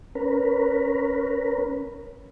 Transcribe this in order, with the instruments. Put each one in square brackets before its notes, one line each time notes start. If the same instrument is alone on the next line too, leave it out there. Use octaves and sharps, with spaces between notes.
[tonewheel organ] C#4 A#4 B4